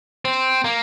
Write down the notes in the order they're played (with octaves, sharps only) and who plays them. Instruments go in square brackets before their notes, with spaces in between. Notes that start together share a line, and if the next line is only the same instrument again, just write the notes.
[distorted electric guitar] C4
A#3